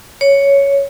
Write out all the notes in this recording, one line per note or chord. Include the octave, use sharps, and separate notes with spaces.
C#5